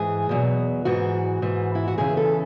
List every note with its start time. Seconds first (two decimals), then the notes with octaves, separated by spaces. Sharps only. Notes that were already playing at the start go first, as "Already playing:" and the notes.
Already playing: G#2 E3 G#4
0.29 E2 B2 F#3
0.85 G#2 E3 F#4
1.42 G#2 E3
1.75 E4
1.87 F#4
1.98 E2 C#3 E3 G#4
2.17 A4